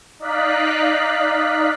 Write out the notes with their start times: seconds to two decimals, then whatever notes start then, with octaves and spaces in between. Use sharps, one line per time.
0.19 D#4 D5 D#5 F5 F#6 B6